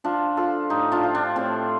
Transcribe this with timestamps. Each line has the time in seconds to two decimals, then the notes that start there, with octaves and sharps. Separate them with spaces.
0.04 F3 D4 F4
0.37 F3 F4 A4
0.70 A2 D#4 G4
0.92 D4 F4
1.04 F3
1.15 D4
1.36 A2 C4